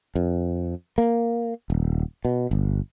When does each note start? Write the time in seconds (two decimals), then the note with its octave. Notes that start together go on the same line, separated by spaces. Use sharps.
0.15 F2
0.98 A#3
1.70 D#1
2.25 B2
2.51 G1